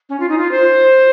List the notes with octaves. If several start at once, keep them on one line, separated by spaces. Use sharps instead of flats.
C#4
F4
D#4
F4
C5